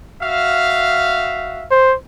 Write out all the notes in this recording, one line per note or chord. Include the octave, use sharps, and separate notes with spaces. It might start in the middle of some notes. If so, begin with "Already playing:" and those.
F#4 E5 F5
C5